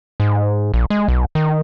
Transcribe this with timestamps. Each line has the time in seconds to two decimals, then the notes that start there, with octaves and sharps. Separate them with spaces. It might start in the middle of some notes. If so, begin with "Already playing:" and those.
0.20 G#2
0.74 A#1
0.90 G#3
1.08 B1
1.35 D#3